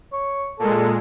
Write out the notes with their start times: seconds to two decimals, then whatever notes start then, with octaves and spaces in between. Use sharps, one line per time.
0.12 C#5
0.59 A#2 G#3 A4